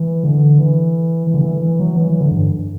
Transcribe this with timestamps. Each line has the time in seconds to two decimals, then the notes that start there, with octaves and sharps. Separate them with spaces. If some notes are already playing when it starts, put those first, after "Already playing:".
Already playing: E3
0.24 D3
0.58 E3
1.27 E3
1.34 D3
1.41 E3
1.62 E3
1.80 F#3
1.97 E3
2.09 E3
2.21 D3
2.31 G2